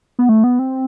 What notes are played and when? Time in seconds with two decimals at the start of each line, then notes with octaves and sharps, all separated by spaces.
0.19 B3
0.29 A3
0.44 B3
0.59 C4